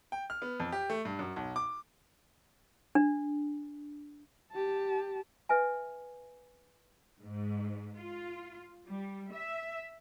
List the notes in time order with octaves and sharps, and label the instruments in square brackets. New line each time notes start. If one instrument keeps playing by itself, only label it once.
[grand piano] G5
F6
B3
F2
G4
A3
G2
F#2
B1
D6
[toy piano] D4
[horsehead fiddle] G4 A5
[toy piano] B4 E5 G#5
[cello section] G#2
F4
G3
E5